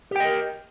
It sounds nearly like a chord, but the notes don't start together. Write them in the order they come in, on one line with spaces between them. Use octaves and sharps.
G4 G5 D#5 A#4